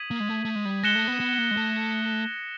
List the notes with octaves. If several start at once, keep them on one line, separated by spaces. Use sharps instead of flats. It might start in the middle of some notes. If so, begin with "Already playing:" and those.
Already playing: D#6 G#6 B6 D#7 F#7
A#3
G#3
A3
A3
G#3
G3
G#3 F#6 A#6 C#7 E7 G7
A3
B3
B3
A#3
G#3
A3